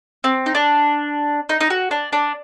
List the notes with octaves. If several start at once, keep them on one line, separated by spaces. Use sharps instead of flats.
C4
D#4
D4
D#4
D#4
F#4
D4
D4